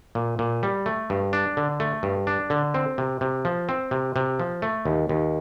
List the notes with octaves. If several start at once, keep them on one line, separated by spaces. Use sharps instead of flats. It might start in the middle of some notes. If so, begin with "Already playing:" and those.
A#2
A#2
G3
A3
G2
D4
D3
A3
G2
D4
D3
C4
C3
C3
F3
C4
C3
C3
F3
A3
D#2
D#2